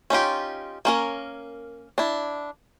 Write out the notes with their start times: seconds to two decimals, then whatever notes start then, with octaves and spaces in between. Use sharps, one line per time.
0.10 C#4 D#4 F4 G4
0.85 A#3 C#4 A#4
1.98 D4 E4